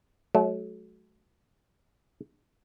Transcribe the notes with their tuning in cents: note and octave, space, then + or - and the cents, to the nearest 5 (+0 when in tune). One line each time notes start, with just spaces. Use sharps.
F#3 +0 A3 -35